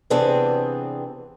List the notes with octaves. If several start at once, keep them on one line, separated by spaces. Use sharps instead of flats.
C3 E3 B3 C4 D4 G#4